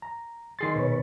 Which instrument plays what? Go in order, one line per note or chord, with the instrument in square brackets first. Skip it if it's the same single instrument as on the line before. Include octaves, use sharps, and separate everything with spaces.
[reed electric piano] A#5
[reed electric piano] D#3 G#4 A6 [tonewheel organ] C6
[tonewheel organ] B2 B4 C#5